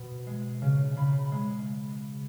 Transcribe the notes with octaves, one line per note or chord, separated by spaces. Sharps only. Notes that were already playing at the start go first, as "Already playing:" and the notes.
Already playing: B2
G#3
C#3
C#3 B5
G#3